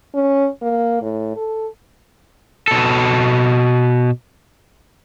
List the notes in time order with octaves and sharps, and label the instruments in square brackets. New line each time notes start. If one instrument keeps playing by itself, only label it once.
[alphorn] C#4
A#3
A2
A4
[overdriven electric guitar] B2 A4